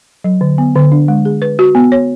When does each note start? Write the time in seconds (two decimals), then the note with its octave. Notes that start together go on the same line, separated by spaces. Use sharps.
0.24 F#3
0.41 D3
0.58 B3
0.75 D3
0.92 D4
1.08 G#3
1.25 G#4
1.42 B4
1.59 F#4
1.75 B3
1.92 C#5